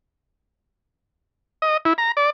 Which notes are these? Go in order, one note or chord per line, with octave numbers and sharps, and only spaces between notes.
D#5
E4
A#5
D5